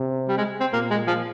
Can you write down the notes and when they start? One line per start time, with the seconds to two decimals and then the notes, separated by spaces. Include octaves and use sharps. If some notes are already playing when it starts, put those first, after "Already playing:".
Already playing: C3
0.29 G3
0.38 G#3
0.61 C4
0.73 A#2 A#3
0.90 G#3
1.07 F3